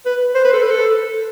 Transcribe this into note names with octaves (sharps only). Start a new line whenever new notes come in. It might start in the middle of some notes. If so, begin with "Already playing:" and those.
B4
C5
B4
A4
B4
A4